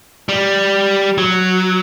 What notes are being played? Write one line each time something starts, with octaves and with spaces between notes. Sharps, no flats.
G3
F#3